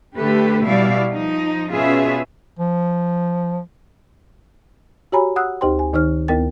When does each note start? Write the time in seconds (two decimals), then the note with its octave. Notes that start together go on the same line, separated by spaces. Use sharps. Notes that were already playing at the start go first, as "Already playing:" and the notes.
0.16 D3 A3 G4 B4
0.66 B2 G3 E4 D5 F5
1.13 F3 D#4
1.71 B2 C#4 F4 G#4 B4 E5
2.59 F3
5.12 F#4 G4 C#5 G#5 A#5 B5
5.36 F#5 D#6 E6 F#6
5.61 D2 D#4 G4 C5 G5 C6
5.79 G#5
5.93 D2 D#3 D#4 C5 F6
6.28 D2 B3 E4 A#4 G5 A6